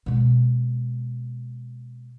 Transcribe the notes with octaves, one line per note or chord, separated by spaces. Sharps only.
B2 G#3